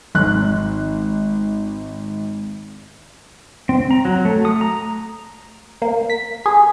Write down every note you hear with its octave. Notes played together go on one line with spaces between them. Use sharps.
G#1 F#6
C4
A#5
F#3
A3
D#6
A#5
A#3
B6
G#4